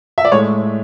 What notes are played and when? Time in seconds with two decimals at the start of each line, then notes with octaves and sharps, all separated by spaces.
0.18 E5
0.25 D5
0.32 A2 G#3 C#5